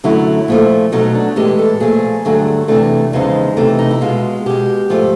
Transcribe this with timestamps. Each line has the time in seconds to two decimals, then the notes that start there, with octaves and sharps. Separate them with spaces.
0.04 F#2 D3 F#3 A3 E4
0.48 A#2 F3 A3
0.92 B2 F#3 A3 D#4
1.15 D4
1.36 A2 E3 G#3 G4
1.59 A4
1.80 A#2 F3 A3 G#4
2.25 G2 D3 F#3 A3
2.68 E2 C3 E3 A3 D4
3.13 E2 C#3 F3 G#3 D#4
3.57 C3 E3 A3
3.79 D#4
3.91 E4
4.01 B2 G#3 F4
4.46 B2 G#3 G4
4.90 G#2 F3 A3